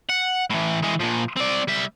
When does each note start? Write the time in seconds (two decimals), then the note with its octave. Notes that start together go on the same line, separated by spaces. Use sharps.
0.10 F#5
0.50 A2 E3
0.82 E3 G#3
1.00 A#2 F3
1.36 C4 D5
1.68 G3 E5